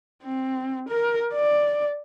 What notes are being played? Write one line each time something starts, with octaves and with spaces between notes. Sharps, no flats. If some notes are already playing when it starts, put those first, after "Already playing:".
C4
A#4
D5